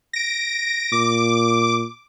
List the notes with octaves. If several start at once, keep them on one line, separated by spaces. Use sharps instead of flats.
A#6 D7
A#2 D6